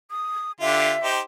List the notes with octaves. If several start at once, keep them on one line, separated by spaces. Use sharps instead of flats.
D#6
D3 F4 G4 E5
D#4 G4 C5